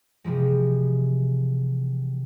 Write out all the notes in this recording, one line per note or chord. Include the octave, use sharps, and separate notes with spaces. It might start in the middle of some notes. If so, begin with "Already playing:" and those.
C3 E3 F3 G#3